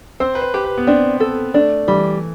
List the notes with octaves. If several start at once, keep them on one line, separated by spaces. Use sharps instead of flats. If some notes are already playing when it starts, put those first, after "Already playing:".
C4 C5
B4
C5
G4
B4
B3
C4 D4
A4
A3 D4
E3 G3